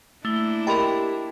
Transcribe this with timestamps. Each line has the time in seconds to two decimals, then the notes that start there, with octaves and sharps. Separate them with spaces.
0.25 A3 A#3 D4 E4 G7
0.67 G4 A#4 D#5 G5 B5 C6